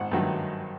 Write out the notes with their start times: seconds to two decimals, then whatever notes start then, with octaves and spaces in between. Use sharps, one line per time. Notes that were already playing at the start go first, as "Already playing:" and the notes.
Already playing: G#1 F#5
0.12 G2 D#3 F#3 A3